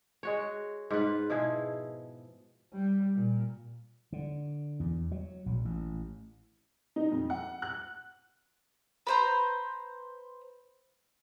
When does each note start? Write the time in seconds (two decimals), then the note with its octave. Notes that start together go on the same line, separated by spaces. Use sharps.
0.23 G#3 F#4 C#5
0.90 G#2 F4 B4
1.30 B2 F3 E4 G#4
2.73 G3
3.16 A#2
4.13 D3
4.80 E2
5.11 F#3
5.46 A#1
5.65 A1
6.96 D#4
7.12 F2
7.30 F#5
7.62 F#6
9.07 B4 C5 A#5